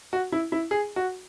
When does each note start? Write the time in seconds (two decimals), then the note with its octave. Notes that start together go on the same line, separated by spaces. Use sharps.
0.13 F#4
0.32 E4
0.52 E4
0.71 G#4
0.96 F#4